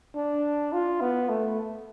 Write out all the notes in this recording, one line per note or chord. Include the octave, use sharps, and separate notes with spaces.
D4
F4
B3
A3